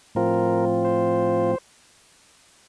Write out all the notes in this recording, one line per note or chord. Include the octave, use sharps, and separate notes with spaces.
A2 F3 C4 F4 A#4
C5